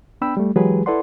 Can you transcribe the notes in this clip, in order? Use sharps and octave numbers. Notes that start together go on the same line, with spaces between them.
B3 D4 G5 B5 E6
G3 A3
E3 F#3 G#3 G4 G#4 B4
E4 A4 B4 D5 F#5 C6